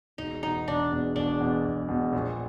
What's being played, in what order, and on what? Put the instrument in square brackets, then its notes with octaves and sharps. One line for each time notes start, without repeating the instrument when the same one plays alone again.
[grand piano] E1 [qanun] D#4
[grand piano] E2 B2 [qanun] D#4
[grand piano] E1 [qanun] D4
[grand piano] E2 B2
[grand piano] E1 [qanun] D4
[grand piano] E2 B2
E1
E2 B2
A#1